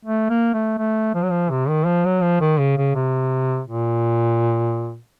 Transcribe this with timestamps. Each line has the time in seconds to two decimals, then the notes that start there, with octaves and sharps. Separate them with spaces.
0.05 A3
0.30 A#3
0.54 A3
0.79 A3
1.15 F3
1.23 F#3
1.30 F3
1.51 C3
1.69 D#3
1.86 F3
2.05 F#3
2.23 F3
2.41 D#3
2.59 C#3
2.78 C#3
2.95 C3
3.68 A#2